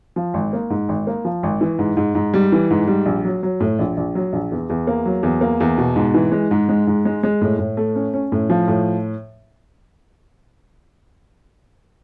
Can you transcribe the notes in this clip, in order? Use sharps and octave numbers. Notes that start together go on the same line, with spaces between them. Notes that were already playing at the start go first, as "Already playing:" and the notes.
F3
G#1
A#3
G#2
G#1
A#3
F3
G#1
E3
G#2
G#2
G#2
G3
E3
G#2
G3
A#1
F#3
F#3
A2
A#1
A#1
F#3
A#1
E2
E2
A#3
F#3
E2
A#3
E2
B2
G#2
E3
G#3
G#2
G#3
G#2
G#3
G#3
A2
A2
A3
C#4
C#4
A2
F3
A2